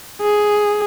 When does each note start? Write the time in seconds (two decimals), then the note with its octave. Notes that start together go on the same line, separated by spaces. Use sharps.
0.22 G#4